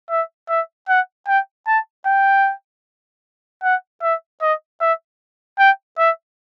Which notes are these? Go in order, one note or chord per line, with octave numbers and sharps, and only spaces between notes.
E5
E5
F#5
G5
A5
G5
F#5
E5
D#5
E5
G5
E5